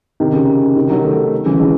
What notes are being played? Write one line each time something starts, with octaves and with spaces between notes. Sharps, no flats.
C3 D#3
C#3
C3 D#3
D#3 F#3
F#3 A3
C#3 E3
E3 G#3